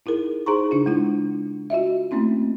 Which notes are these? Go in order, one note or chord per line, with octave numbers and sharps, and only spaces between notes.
D#4 E4 G#4 A#4
D#4 G#4 C5 A#5 C6 C#6
C#3 D4 F4
G#3 E4 F4
F4 F#4 D#5 E5
A3 A#3 C4 C#4 E4